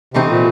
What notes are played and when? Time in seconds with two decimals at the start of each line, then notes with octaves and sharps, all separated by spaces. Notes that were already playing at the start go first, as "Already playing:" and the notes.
0.14 C3 E3 A3 C4 D#4
0.29 A#2